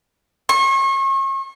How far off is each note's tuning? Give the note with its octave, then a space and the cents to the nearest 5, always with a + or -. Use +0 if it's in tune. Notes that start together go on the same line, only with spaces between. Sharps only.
C#6 -40